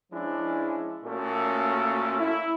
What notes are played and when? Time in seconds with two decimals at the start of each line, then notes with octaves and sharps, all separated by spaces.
0.12 F3 G#3 C#4 D4 E4
1.04 A#2 A3 A#3 C#4 F#4 A4
2.19 E4